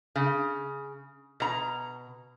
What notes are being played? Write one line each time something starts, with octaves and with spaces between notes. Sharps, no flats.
C#3
B2 A#5